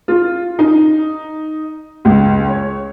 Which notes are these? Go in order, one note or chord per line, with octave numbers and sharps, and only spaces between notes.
F4
D#4
C#2
C#5